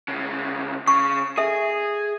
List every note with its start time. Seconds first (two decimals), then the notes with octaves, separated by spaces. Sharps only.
0.08 C2 C#3
0.88 C#3 C#6
1.38 G#4 A4 E5